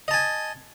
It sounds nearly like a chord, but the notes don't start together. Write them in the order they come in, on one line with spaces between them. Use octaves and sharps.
D#5 A5 G#5